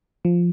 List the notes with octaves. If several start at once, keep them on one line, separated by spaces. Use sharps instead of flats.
F3